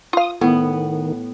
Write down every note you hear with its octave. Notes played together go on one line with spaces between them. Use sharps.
F4 F5 D#6
A2 D#3 B3